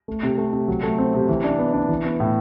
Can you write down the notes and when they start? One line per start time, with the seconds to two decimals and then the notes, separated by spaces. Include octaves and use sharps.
0.08 A3
0.23 C3
0.38 A3
0.53 C3
0.68 F#3
0.83 A3
0.98 C4
1.14 C3
1.29 E3
1.44 D4
1.59 B3
1.73 D4
1.89 E3
2.05 B3
2.20 A2